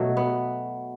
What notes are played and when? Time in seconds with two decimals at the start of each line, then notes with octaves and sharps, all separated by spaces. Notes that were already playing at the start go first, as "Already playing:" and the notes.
Already playing: B2 F#3 A3
0.17 B3